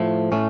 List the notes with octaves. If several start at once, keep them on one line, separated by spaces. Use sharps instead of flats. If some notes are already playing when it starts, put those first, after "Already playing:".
Already playing: A2 F3 A3
A2 A3 C#4